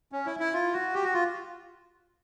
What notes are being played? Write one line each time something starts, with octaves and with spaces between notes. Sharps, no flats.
C#4
E4
E4
F4
F#4
G4
F#4
F4